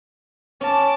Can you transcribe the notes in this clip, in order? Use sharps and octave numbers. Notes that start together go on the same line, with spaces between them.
C#4 A5 D6